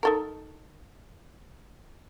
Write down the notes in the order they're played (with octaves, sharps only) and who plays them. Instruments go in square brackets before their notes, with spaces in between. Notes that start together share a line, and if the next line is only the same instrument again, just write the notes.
[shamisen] D#4 A4 A#4